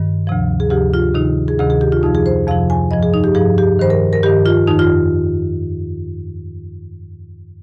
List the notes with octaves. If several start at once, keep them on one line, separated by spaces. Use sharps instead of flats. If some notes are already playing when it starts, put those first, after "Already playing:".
Already playing: G2 D#3
D2 C3 F3
G#4
D2 C3 F3 G4
F4
D2 C3 D#3 D#4
G#4
D2 C3 D#3 G#4
G#4
G4
F4
F2 C3 F3 D#4
G#4
C5
F2 C3 F3 F5
G#5
G2 F3 D#5
G#4
D#4
G4
G2 F3 G#4
G4
G2 D#3 C5
A#4
A#4
G2 D#3 G4
F4
F2 D#3 D#4
F4